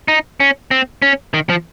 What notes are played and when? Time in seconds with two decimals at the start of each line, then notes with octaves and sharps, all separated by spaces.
0.08 D#4
0.40 C#4
0.71 C4
1.02 C#4
1.34 D#3
1.49 F3